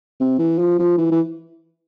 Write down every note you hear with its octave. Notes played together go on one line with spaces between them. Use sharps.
C3
E3
F3
F3
E3
E3